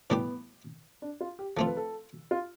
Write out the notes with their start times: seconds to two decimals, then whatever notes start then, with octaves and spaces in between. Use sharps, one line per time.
0.10 A2 E3 G3 B3 D4 G4
1.02 D4
1.21 F4
1.39 G4
1.57 F3 A3 C4 F4 A4
1.66 B4
1.77 A4
2.31 F4